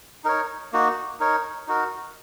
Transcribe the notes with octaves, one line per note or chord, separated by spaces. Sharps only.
D#4 A#4 C#5
A#3 D#4 F#4
D#4 A#4 C#5
D#4 F#4 A#4